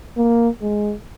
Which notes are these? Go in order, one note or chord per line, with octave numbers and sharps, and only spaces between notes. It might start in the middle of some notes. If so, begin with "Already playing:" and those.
A#3
G#3